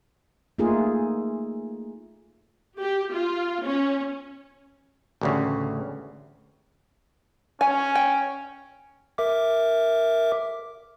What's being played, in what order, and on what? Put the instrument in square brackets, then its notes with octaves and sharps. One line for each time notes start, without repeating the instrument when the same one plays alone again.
[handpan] A3 A#3 D#4 F4 G#4
[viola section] G4
F4
C#4
[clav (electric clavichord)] A1 D2 C#3
[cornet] C#4 [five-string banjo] G#5
[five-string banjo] G5
[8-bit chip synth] A#4 E5 D6